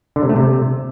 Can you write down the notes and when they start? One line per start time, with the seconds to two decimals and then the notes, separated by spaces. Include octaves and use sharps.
0.16 D3
0.23 C3
0.29 A3
0.36 C3